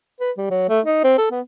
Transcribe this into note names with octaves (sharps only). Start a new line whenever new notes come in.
B4
G3
F#3
A3
D#4
C4
A4
B3